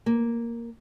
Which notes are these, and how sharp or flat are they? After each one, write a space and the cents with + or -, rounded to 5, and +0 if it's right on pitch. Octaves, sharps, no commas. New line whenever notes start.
A#3 +0